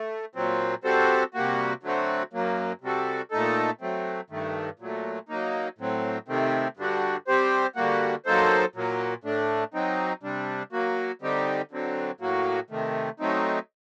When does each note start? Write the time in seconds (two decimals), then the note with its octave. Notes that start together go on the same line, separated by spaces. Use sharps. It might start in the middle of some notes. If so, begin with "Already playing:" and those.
Already playing: A3
0.35 A#2 F#3 C4
0.84 G3 C4 F#4 A4 C5
1.34 C3 G3 A#3 F#4
1.83 D3 F#3 A3 C4 F#4
2.33 F#2 F#3 A#3
2.81 C3 G3 C4 F#4 A4
3.31 A#2 A3 D#4 A4
3.81 F#3 A3 C4
4.30 G2 D#3 A3
4.79 A#2 F#3 A3
5.29 F#3 A#3 D#4
5.78 A2 F#3 C4
6.28 C3 D#3 A3 C4
6.77 G2 D3 G3 D4 F#4
7.27 G3 C4 G4 C5
7.75 D3 G3 A#3 F#4
8.26 F#3 A#3 D#4 A4 C5
8.75 A#2 F#3 A#3
9.24 A2 A3 D4
9.74 F#3 C4 D#4
10.23 C3 G3 D4
10.72 F#3 A#3 F#4
11.22 D3 G3 C4 D#4 G4
11.71 D3 F#3 C4
12.21 A2 F#3 A#3 F#4
12.70 C3 D#3 A3
13.20 F#3 A3 C4 D#4